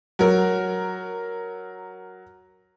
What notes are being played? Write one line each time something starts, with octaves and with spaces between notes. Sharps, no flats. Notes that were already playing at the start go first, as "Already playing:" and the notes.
F#3 A#4